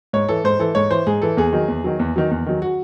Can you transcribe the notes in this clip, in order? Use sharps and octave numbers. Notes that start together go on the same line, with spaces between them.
G#2 C#5
E3 A4
G#2 C5
E3 A4
G#2 C#5
E3 C5
G#2 G#4
E3 A4
E2 G#4
D#3 F#3
E2
D#3 F#3
E2
D#3 F#3
E2
D#3 F#3
F#4